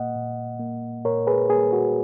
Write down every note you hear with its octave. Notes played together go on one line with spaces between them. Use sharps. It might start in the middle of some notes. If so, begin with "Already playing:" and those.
Already playing: A#2 A#3 D#5 F#5
A#2
A#3
A#2 A#4 C#5
G#4 B4
A#3 G#4
F#4